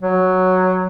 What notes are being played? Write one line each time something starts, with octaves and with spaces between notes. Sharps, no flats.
F#3